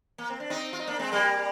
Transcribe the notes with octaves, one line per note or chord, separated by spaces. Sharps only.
A#3
C4
D4
C4 D#4
F4
D#4
A#3 D4
G#3 C4
G3 A#3